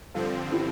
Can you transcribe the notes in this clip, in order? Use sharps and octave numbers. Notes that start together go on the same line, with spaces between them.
G2 D3 F3 C4 F4 A4
E4 G4